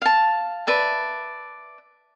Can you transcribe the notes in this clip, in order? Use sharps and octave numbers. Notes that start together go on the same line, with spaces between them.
F5 A5
B4 D5 E5 A5